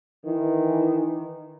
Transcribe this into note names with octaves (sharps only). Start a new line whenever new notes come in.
D#3 E3